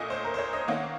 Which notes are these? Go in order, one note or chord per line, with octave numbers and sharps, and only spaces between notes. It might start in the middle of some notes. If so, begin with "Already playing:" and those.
Already playing: A#2 A3 C#4 D#5
C5
A#4
C5
C#5
D#5
D#3 A#3 C#4 F#5